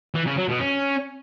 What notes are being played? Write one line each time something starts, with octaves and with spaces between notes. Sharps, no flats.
E3
C#3
F#3
B2
C#4